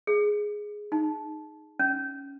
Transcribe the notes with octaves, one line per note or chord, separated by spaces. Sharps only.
G#4
D#4
C#4